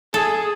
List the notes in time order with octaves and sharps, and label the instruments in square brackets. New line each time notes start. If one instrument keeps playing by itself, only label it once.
[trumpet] G#4 [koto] A4